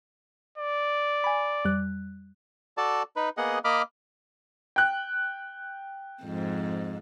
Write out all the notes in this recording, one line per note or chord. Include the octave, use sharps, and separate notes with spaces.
D5
G#5 B5
F2 G3 F#6
F#4 A4 D5 A5
D#4 B4
A#3 B3 G#4 D#5 F#5
A#3 D#5 B5 D6 F6
G5 F#6
F2 G#2